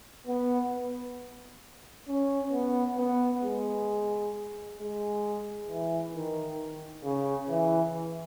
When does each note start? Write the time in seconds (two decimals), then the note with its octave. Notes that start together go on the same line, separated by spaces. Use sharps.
0.27 B3
2.08 C#4
2.52 B3
2.97 B3
3.44 G#3
4.79 G#3
5.68 E3
6.14 D#3
7.04 C#3
7.50 E3